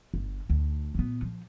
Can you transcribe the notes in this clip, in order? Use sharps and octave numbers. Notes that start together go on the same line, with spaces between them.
G1
D2
A#2 B3
F3